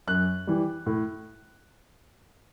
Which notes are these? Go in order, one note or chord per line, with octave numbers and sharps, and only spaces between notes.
F#2 F#6
E3 G3
A2